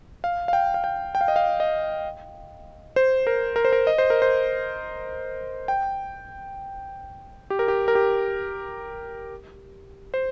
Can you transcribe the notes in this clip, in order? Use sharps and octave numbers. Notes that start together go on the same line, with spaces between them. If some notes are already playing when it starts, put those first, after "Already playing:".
F5
F5
G5
F5
G5
G5
F5
D#5
F5
D#5
C5
A#4
A#4
C5
A#4
D#5
C5
A#4
C5
G5
G4
A#4
G4
A#4
G4
C5